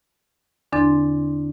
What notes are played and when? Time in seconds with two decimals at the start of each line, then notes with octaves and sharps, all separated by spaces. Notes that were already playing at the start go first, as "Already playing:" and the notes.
0.72 E2 D3 C4 D4 C6 A6